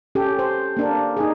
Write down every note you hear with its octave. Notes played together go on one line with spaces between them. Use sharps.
C#4 G4 A4
C5
A#3 D4 A#4
D#4 G#4